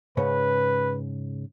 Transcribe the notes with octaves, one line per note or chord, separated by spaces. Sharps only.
G#2 C#3 C#4 B4